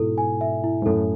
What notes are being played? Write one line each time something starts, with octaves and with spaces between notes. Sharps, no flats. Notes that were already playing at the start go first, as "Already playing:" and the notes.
Already playing: G#2 B2 E4 A4
G#5
E5
E4
G#2
F#2 A2 A4